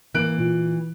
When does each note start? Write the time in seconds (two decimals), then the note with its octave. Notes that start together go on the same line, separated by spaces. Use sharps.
0.14 E3 A#3 F#6 D7
0.38 A#2